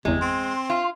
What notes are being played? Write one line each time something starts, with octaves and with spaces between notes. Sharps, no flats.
G1 E2 C3 G#3
C4 C6
F4